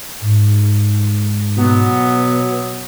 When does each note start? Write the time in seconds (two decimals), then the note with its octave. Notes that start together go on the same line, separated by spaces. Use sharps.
0.21 G#2
1.57 B2 F#3 B3